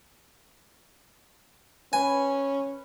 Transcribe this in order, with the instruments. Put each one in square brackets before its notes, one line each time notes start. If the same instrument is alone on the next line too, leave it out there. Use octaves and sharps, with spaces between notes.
[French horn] C#4 [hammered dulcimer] B4 [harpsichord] G#5